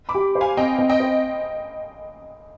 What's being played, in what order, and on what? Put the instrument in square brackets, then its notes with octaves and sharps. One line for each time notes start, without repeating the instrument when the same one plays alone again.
[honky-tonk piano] B5 D6
[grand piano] G4
C5
[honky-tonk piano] F5 G#5
[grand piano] C4 [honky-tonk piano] D#5 G5
[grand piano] C4
[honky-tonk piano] D#5 G5
[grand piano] C5